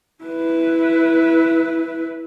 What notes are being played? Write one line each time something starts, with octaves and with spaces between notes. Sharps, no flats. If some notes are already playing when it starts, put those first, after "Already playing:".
E4 B4